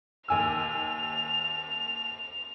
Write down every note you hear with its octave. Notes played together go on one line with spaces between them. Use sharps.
D#2 G#5 E6 F7